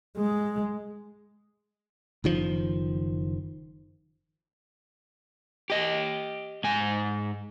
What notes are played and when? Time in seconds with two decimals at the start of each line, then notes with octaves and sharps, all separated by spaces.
0.17 G#3
2.24 F#1 D#3 F3
5.70 G4 D#5
6.64 G#2 G#5